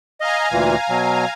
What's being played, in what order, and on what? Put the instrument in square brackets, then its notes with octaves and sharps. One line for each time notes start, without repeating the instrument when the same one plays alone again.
[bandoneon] D#5 [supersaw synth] F5 G#5 A#5
[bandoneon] D2 A#2 E3
B2 F#3